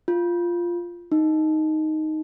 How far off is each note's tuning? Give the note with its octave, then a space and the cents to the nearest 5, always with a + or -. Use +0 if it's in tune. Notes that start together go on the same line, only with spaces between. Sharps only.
F4 -5
D#4 +0